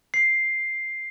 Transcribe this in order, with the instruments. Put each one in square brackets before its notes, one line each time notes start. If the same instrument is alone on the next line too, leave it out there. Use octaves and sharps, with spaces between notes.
[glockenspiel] C7